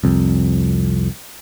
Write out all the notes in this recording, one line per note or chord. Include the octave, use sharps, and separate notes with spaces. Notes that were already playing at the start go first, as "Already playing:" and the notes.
C2 F2